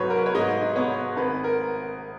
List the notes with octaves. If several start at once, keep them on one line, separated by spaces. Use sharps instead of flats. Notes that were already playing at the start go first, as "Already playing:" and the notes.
Already playing: G#2 F#3 B4 C#5
A#4
B4
C#5
G#2 D#5
B3 C#5
G#1 B4
A#4